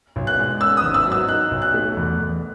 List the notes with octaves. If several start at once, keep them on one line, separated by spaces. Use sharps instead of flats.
B1
F#6
G#3
C#4 E6
D#6
G#1
E6
F#3
E6
D#4 F#6
B1
F#6
A3
E2
E2